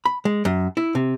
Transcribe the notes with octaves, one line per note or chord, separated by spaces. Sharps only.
B5
G#3
F#2
E4
C3